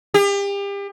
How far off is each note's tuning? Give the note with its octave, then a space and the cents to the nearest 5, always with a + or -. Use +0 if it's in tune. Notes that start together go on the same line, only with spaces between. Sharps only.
G4 +35